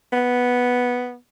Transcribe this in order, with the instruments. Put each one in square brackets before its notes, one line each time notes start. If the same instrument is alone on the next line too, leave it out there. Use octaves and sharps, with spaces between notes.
[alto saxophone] B3